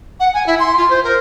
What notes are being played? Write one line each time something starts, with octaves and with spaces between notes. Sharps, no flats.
F#5
G#5
E4
C6
F4
C5
A#4